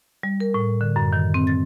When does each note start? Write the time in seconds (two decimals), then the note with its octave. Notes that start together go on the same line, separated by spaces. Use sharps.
0.23 G3
0.40 A#4
0.54 A2
0.81 D3
0.96 F#2
1.13 D#3
1.34 C4
1.47 A6